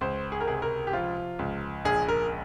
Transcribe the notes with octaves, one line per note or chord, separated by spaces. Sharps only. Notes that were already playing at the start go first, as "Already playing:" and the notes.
C#2 C5
G#4
A#4
C3 G#4
A#4
G4
F3 F4
C#2
A#1 G#4
A#4